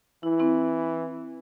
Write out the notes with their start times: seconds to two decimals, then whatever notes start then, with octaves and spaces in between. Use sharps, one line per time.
0.23 E3 E4
0.40 C4 E4